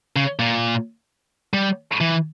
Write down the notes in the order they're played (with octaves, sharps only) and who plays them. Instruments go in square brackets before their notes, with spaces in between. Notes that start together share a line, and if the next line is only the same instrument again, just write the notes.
[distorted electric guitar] C#3
A#2
G3
E3